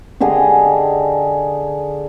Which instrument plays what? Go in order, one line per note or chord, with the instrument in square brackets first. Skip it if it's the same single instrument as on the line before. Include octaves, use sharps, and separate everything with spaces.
[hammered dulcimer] D3 G4 G#4 D#5